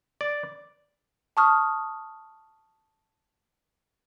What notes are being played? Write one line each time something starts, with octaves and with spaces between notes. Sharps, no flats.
D5
A5 C#6 D#6 F6